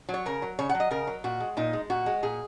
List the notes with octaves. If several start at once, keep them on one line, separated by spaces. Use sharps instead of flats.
F#3
C#5
C#3 A#4
F#3
C#3 C#5
F#5
F#3
D#5
C#3 A#4
F#3
A#2 F#4
G#3
A#2 D#4
G#3
A#2 F#4
G#3
A#2 G#4